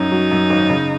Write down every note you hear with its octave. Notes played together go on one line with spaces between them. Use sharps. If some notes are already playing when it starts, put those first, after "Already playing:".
Already playing: F#2 C#4 D#4
F#3
F#2
G#1
C#3